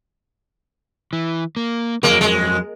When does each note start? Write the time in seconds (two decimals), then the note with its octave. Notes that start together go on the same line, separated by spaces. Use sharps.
1.13 E3
1.57 A#3
2.03 F2 F#3 G#3 A#3
2.21 G#3